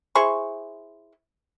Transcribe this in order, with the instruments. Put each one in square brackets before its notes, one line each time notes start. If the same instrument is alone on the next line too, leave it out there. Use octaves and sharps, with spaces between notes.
[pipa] E4 G#4 C5 C#6